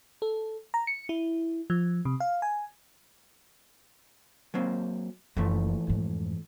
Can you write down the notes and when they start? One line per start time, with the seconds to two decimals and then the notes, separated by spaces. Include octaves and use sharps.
0.22 A4
0.74 A#5
0.87 C#7
1.09 E4
1.70 F3
2.05 C3
2.20 F5
2.42 G#5
4.54 F#3 A#3 C4
5.37 F#1 E3 F3 A3
5.87 F2 G#2